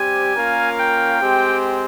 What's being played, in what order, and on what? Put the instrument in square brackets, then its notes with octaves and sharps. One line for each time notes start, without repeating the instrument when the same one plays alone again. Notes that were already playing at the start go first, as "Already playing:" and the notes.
Already playing: [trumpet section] G3 C4 G4 C5 [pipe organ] G#5
[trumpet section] A#3 C#4 F4 A#4 F5
[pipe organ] G5
[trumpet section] G#3 C4 G4